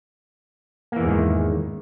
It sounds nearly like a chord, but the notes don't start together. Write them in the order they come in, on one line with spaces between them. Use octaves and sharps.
A#3 E3 E2 G#2 D#3